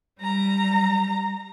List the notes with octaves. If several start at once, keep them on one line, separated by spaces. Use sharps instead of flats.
G3 A#5